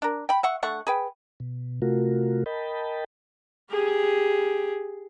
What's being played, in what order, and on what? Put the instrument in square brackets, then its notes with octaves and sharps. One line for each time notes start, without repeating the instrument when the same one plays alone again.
[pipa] D4 A#4
G5 B5
E5 F#5 C#6
D3 A3 F#5 C#6
G#4 B4 G5
[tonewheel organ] B2
C3 A3 F4 F#4 A#4
A#4 D#5 G5 A5 B5
[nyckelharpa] G4 G#4